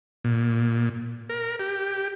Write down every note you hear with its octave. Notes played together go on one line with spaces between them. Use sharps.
A#2
A#4
G4